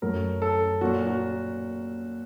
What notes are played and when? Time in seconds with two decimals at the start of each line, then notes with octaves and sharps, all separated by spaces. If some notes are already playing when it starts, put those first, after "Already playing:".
0.02 F#2 F#3 A3 A#4
0.42 A4
0.81 A#2 F#3 A#3 F#4
1.07 F#4